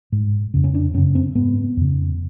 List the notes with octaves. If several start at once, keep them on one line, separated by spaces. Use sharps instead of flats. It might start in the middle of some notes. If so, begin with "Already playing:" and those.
G#2
F2 C#3
C#4
D4
F#2 C#3 C#4
C4
G#2 B3
F2 C#3